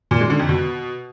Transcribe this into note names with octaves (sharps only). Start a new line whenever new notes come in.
A#2
G#3
D3
F2
B2